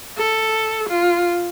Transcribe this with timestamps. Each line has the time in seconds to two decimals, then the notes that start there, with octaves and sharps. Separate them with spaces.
0.18 A4
0.89 F4